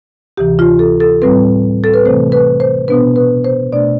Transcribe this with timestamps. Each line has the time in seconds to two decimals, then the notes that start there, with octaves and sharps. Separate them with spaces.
0.37 D2 C3 E3 G4
0.59 F4
0.79 A4
1.00 A4
1.22 A2 G3 C4 B4
1.84 A4
1.94 B4
2.04 C3 E3 A3 C4 C5
2.32 B4
2.60 C5
2.88 B2 B3 D4 B4
3.16 B4
3.44 C5
3.73 B2 A3 D4 D5